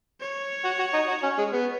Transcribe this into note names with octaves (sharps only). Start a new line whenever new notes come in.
C#5
F#4
F#4
D#4
F#4
C#4
G#3
B3